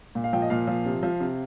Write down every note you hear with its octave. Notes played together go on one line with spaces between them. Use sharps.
A#2
F5
F3 G5
D#5
A#2 F5
F3
C3
F3
C3